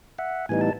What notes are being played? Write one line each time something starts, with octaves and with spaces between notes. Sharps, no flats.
E5 F#5
A2 E3 G3 B3 D#4 G#5
A5